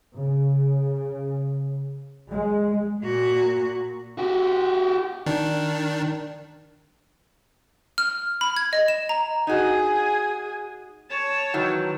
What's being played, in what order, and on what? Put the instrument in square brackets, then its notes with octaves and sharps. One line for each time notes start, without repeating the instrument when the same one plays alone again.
[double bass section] C#3
G#3
[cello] A#2 F#4
[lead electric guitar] F#4 G4
[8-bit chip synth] D#3 D4
[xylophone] F6
B5
G#6
D#5
E7
A#5
[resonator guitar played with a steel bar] D#4 F#4 [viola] G#4 G#5
[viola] C#5 A5
[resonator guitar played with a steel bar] D#3 E3 F#3